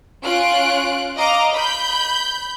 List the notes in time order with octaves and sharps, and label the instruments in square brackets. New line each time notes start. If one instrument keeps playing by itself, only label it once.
[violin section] C#4 F4 F#6 D7
D#5 F5 A#5 D6
B5 G6